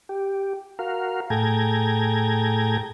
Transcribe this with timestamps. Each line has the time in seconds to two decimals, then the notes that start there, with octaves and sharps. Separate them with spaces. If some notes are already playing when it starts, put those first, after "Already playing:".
0.09 G4
0.79 F#4 A#4 F5
1.30 A2 G#4 A4 G5 A#5 G#6